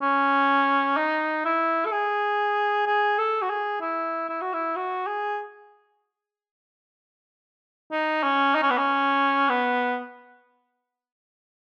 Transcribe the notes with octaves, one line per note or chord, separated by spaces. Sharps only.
C#4
D#4
E4
A4
G#4
G#4
A4
F#4
G#4
E4
E4
F#4
E4
F#4
G#4
D#4
C#4
D#4
C#4
B3
C#4
B3